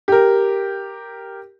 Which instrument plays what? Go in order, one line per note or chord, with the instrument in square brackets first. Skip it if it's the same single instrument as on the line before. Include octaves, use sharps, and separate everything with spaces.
[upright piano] G4 A#4